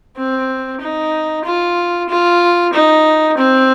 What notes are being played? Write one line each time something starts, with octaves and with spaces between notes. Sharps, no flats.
C4
D#4
F4
F4
D#4
C4